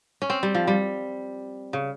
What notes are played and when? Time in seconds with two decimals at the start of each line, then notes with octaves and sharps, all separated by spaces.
0.22 C#4
0.30 C4
0.43 G3
0.55 F3
0.68 G3
1.73 C#3